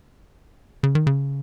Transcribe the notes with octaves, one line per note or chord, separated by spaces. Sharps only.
C#3
D#3
C#3